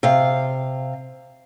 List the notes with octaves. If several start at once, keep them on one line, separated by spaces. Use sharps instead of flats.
C3 F5